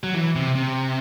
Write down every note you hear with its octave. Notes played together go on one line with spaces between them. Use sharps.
F#3
E3
C3
C3